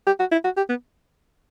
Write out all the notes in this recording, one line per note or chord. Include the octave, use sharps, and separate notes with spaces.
G4
F#4
E4
F#4
G4
B3